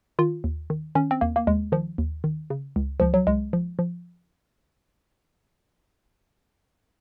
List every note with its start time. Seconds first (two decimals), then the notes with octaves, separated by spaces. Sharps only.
0.19 D#3 F4
0.44 D#2
0.70 D#3
0.95 D#3 C#4
1.11 C4
1.21 D#2 A#3
1.36 A#3
1.47 D#2 G#3
1.72 D#3 F3
1.98 D#2
2.24 D#3
2.50 C#3
2.76 C#2
3.00 C#2 F3
3.14 F#3
3.27 C#2 G#3
3.53 F3
3.79 F3